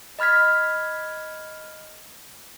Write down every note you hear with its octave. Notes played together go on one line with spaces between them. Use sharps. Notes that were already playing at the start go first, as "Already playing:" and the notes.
D#5 B5 F6 G#6 B6